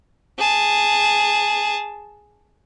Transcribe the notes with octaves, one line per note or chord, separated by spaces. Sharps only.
G#4 A5